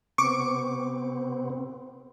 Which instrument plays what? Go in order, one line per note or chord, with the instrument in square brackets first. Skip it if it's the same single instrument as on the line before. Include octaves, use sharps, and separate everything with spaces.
[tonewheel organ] C3 B3 C4 [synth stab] C#6 D6